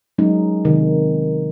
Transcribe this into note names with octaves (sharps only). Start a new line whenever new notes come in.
F#3 G#3 C#4 D#4
C3 D#3